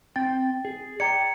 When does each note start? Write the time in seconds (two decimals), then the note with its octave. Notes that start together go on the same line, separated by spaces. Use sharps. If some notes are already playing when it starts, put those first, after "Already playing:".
0.16 C4 G5 A6
0.65 G#4
1.00 D5 G5 A#5 G#6 C#7